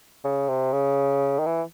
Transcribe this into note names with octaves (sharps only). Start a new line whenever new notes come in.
C#3
C3
C#3
D#3
E3